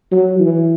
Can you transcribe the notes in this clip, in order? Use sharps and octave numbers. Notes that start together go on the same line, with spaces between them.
F#3
E3